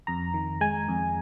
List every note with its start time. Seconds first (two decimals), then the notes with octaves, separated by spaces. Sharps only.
0.07 F2 A#5
0.34 D#3
0.61 G#3 G#5
0.88 F2